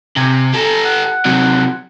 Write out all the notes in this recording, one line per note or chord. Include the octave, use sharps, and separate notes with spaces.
C3 G#5
G4 A4 A#5
F#5
C3 F#3